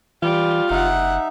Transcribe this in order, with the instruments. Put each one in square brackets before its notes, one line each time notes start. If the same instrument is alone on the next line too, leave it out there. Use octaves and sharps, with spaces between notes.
[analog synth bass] E3 [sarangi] G3 [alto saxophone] F4
[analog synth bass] F#1 [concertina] D#4 E5 [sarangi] F#5